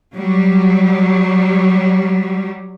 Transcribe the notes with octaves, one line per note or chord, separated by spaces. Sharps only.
F#3 G3